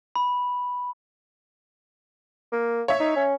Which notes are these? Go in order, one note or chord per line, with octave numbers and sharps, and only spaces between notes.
B5
A#3
C#5 E5
D#4
C#4